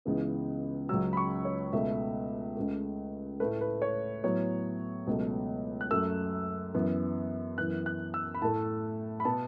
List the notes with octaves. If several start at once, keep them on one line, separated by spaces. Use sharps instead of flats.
C#2 C#3 E3 B3
C#2 C#3 F#3 E6
B5
C#6
C#5
C#2 B2 A3 E5
C#2 C#3 A3
A2 A3 B4
B4
C#5
A2 F#3 B3 C#5
C#2 B2 F#3 A3
F#6
F#2 F#3 A3 E6
F#2 E3 B3
F#2 E3 B3 F#6
F#6
E6
B5
A2 A3 A5
B5
B2 B3 A5